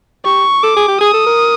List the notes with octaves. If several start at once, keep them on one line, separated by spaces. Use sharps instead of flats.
G4 C#6
A4 D6
G#4
G4
G#4 D#6
A4
A#4